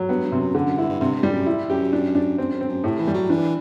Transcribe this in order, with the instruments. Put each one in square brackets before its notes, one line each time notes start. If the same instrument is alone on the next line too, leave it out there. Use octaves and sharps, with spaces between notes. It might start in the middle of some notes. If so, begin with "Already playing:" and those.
Already playing: [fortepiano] F#3
[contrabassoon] G2 [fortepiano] B3
[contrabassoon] G2
[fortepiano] C3
[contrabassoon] F#2
[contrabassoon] F#2 [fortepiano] D3
[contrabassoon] F#2
[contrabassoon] G2 [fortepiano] E4
[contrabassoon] G2
[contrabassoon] G2 [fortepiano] C3
[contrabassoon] G2
[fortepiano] G3
[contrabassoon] F#2
[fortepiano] E4
[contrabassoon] F#2 [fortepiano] G4
[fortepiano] D4
D4
[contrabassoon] F#2 [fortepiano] C4
[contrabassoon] F#2
[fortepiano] C4
[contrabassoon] F#2
[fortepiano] A2 [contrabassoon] C3
[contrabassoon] E3
[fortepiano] G3
[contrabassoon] F#3
[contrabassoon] E3 [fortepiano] D4